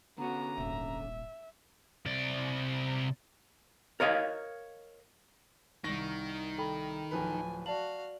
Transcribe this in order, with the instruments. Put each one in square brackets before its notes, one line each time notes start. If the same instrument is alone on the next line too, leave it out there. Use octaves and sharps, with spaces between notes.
[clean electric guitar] D3 C#4 [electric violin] B3 F#4 [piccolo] A#5
[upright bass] D#1 G#1 [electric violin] E5
[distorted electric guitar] C3 D5
[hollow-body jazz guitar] A#4 C#5 D#5 F5
[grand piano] C2 A#6 [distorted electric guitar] D#3 [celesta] C#6
[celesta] A4 G5 B5
[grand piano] D1 F3 B4 [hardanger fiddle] G#5
[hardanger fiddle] F#4 F5 [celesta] D5 F#7 [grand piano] A5